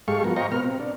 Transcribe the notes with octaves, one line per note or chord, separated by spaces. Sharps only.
G#2 G#3 G4 A4 F5 C#6
F3 B3 F#4 A#4
C5 D#5 F5 G5 A#5 C#6
B2 B3 A#4 F6
C4
D4